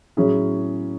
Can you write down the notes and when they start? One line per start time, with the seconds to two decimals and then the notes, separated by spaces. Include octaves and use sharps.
0.17 A2 F#3 C#4 E4 G#4